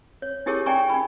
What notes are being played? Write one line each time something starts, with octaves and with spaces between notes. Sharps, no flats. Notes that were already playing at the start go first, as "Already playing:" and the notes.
C#5
D#4 E4 G4 G#4 A#4 C#5
D5 G5 G#5 A#5 C#6
D#4 B5